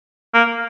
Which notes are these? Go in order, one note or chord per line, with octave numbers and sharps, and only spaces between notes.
A#3